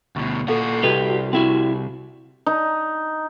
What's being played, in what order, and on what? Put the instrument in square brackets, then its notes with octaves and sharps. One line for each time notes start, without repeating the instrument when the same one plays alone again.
[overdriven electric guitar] D2 B2 [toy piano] C#6
[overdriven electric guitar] A#2 F#4 [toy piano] A4 F5
[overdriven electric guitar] C2 [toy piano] F#4 A4 D#5 [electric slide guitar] G4 B4 G5
[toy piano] F#4
[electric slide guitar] C4 E4 F#4 [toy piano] G4 F5 G5
[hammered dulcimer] D#4